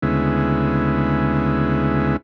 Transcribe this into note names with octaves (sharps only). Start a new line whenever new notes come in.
D2 C#3 G#3 B3 E4